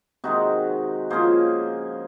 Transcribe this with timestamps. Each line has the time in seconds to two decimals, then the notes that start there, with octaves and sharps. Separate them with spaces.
0.24 C3 D#3 G#3 D#4 F#4
1.10 C#3 F3 A#3 G#4 C5